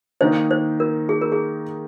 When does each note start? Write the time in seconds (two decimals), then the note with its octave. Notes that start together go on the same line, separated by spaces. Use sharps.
0.21 D#3 A#3 D#4 C5
0.51 C5
0.80 A#4
1.09 G#4
1.21 A#4
1.32 G#4